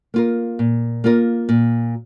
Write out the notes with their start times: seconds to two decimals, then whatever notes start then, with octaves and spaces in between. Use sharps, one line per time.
0.14 A#3 F4 A#4
0.59 A#2
1.04 A#3 F4 A#4
1.49 A#2